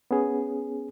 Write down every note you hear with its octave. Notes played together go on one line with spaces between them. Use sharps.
B3 C#4 G#4